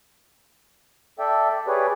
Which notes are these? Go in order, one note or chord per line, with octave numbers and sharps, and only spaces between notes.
A4 D5 E5 G5
G4 G#4 B4 C#5 D5